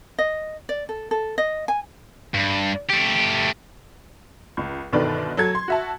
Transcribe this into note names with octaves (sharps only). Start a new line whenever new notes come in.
D#5
D5
A4
A4
D#5
G#5
G2
A3 G4
C#2
G1 B2 D3 D#3 B4 D5
F#3 A4 G#6
C6
F#4 E5 A5